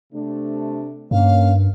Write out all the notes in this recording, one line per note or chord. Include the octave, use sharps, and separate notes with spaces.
C3 A3 D4
G2 A#3 C#4 F5